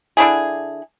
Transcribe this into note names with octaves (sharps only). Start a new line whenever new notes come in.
D3 D4 E4 G#4